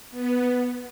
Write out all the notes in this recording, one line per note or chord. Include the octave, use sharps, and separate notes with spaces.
B3